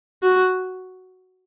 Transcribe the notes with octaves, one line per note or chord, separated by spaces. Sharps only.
F#4